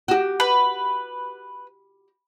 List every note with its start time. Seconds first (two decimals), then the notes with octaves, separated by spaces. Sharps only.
0.08 F#4 G4
0.40 B4